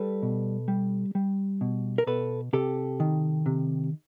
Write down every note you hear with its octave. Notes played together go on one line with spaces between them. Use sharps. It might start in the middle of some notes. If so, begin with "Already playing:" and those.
Already playing: G3 A4 B4
B2
G3
G3
B2
A#4
B2 A4 B4
C3 G4 A4
D#3
C3